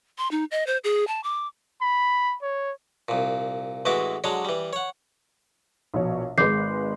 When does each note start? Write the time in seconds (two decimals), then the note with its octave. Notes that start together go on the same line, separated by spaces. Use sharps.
0.18 C6
0.31 D#4
0.51 D#5
0.67 C5
0.84 G#4
1.07 A5
1.24 D6
1.82 B5
2.43 C#5
3.08 C2 A#2
3.85 A1 E3 G#3 F#4 E5 D6
4.24 D3 F#3 G#3 D4 C#5
4.45 E3 G3
4.73 C#5 F#5
5.94 A#1 B2 C#5
6.38 G#1 G#3 B4 D6 G6 C7